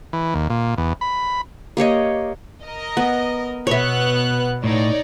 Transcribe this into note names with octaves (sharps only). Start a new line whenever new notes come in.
E3
D#2
A#2
E2
B5
A#3 G4 C#5 D#5
A#4 D#5
B3
B2 B3 C#5 E5 F#6
A2 D#4 C#5 D5